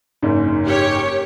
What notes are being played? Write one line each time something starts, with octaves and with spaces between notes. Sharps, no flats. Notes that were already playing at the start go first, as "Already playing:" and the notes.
F#1 G#2
G4 C#5